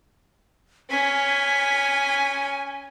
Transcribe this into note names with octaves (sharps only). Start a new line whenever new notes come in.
C#4 G#5 B6